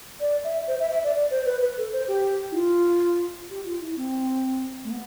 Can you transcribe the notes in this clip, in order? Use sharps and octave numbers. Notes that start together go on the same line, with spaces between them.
D5
E5
C5
E5
E5
D5
D5
C5
B4
B4
A4
C5
G4
E4
F4
G4
F4
E4
C4
A3
B3